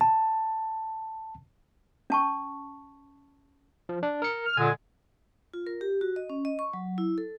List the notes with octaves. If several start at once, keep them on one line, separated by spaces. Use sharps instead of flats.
A5
C#4 A5 C#6
F3
D4
A#4 C#7
F6
A#2 D3 G#3 G#5
F4
A#4
G4
F#4
D#5
C#4
D#5
C#6
F#3
E4
A4